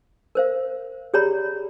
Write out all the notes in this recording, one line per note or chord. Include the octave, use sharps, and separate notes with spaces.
A#4 C5 F5
G4 G#4 C#5 D5 A#5 B5